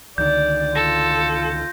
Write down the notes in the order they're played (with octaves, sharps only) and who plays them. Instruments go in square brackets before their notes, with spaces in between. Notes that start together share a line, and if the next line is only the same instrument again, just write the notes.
[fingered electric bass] C#2 D3 D#3 [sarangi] D5 [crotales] G6
[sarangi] F4 [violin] A4 [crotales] A#6